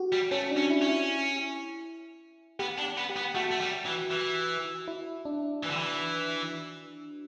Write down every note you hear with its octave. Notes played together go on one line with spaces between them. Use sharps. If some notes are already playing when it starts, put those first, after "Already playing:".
Already playing: F#4 G4
G3
A3 C#4
D4
C#4
E4
C#4
E4
B3 G4
D4
B3
G4
B3
A3 F#4
A3
G3
E3
E3
E4
D4
E3
D3
E3